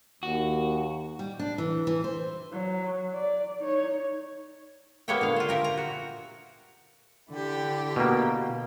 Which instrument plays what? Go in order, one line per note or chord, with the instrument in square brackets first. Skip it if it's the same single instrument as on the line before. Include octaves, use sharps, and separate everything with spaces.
[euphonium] D#2 [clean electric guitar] F#4
[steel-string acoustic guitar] G3
D4
E3
E3
C5
[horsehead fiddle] F#3
D5
D#4 C#5
[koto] A#3 B3 G4 C#5 E5 G5
A#2 D3 F5
F4 C5
G4 A#4 E5
A#5
F#4
[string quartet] D3 E4 G4
[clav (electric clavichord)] B2 A#3